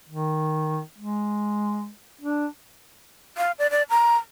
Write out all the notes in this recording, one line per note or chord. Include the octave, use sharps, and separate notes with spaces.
D#3
G#3
D4
F5
D5
D5
A#5